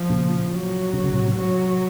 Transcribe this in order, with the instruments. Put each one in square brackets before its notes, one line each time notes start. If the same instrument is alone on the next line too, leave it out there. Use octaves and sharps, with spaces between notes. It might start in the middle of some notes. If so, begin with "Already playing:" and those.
Already playing: [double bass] F3
[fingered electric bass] A#2 C#3
[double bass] F#3
[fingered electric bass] C3
C#3
A2 C3
[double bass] F#3